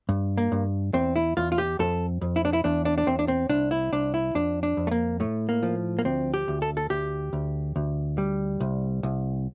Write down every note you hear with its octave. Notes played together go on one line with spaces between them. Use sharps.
G2
A#3
G2
E2 C4
E4
E2 F4
F4
G4
F2 A4
F2
E4
D4
E4
E2 D4
D4
D4
E2 C4
D4
C4
C2 D4
E4
C2 D4
E4
F2 D4
D4
F2
A3
A#3
A2 A3
A#3
F3
A#3
D2 C4
G4
D2
A4
A4
D2 G4
D2
D2
G3
C2
C2